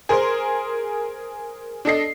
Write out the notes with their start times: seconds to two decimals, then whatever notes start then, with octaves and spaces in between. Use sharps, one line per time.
0.09 G#4 A#4 C5 C6
1.85 D4 A4 D#5 C7